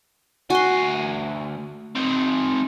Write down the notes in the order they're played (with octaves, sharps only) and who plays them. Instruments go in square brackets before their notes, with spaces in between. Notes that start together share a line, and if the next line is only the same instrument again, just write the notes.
[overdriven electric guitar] D2 G#5 [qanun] F#4 C6
[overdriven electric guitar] C4 D#4